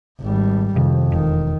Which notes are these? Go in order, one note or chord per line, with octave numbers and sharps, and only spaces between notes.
G#1 G3
F2 C3 D#3
E1 D#3